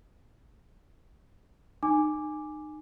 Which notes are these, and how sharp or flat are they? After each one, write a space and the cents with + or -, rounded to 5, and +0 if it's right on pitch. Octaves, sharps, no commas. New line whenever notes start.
D#4 -30 G#5 +0 D6 +0